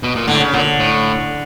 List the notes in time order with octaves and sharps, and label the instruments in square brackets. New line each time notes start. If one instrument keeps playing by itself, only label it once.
[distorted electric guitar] B2
A#2
[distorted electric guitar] A2 [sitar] D3
[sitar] C#3
[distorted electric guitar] A#2 [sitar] D3
[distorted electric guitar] A2